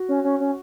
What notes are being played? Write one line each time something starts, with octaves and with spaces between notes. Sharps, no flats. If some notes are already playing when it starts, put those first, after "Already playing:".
Already playing: F#4
C#4
C#4
C#4